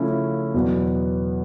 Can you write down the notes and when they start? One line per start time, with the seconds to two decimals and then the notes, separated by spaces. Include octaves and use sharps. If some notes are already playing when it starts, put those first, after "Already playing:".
Already playing: C#3 F3 A3 C#4 E4
0.54 E2 B2 F#3 B3